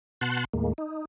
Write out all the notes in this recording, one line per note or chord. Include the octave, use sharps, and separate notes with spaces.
B2 F#5 A5 C6 F#6
D#2 A2 G#3 A#3
D#4